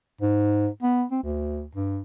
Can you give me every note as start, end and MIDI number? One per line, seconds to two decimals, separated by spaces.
0.21 0.68 44
0.83 1.04 59
1.11 1.21 60
1.23 1.65 38
1.75 2.01 43